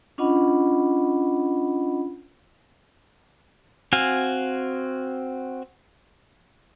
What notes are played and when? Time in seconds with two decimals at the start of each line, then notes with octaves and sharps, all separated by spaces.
0.18 C#4 D4 F4 D#5 F#5 B5
3.93 C4 F#4 F5 G#5